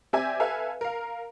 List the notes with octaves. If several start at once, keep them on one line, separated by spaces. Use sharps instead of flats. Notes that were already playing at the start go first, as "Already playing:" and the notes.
C4 G4 D5 E5 G#5
A4 B4 E5 F5 G#5
A#4 F5